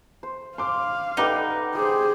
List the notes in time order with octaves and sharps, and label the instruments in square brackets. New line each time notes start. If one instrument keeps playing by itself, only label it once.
[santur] C5
[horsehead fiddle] F5 [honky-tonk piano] C6 D6
[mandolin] D#4 [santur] G4 D5 G5 [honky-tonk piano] A4 B4 F#5
[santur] G4 [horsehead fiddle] G#4 C5